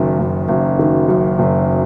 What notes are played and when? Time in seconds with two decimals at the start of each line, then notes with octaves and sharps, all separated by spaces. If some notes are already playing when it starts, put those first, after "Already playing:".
Already playing: F#1 F#2 D#3
0.19 F#1
0.49 F#1
0.79 D#3
1.09 F#2
1.39 F#1